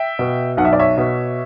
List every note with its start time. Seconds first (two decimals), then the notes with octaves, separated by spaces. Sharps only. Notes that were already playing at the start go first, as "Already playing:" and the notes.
Already playing: E5 G5
0.19 B2
0.57 B1 F#5
0.65 E5
0.73 D5
0.79 C#5 E5
0.97 B2